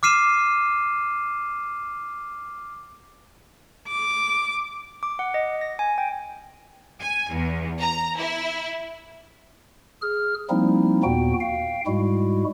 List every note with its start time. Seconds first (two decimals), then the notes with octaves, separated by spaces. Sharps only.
0.03 D6 F6 C7 D#7 E7
3.88 D6
5.03 D6
5.19 F#5
5.34 D#5
5.61 A#6
5.79 G#5
5.98 G5
7.00 G#5
7.33 E2
7.80 A#5
8.17 E4
10.02 G#4 F6
10.50 F3 G3 A#3 C4 D#4 E4
11.04 D#2 A#2 B3 F#4 G5
11.40 F5 G5
11.87 G#2 G3 G#3 E4 F#4